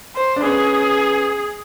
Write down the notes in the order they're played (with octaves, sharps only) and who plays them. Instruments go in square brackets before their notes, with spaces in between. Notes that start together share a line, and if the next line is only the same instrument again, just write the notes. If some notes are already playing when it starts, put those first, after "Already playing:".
[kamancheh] C5
[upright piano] D4
[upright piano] B3 C#4 [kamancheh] G#4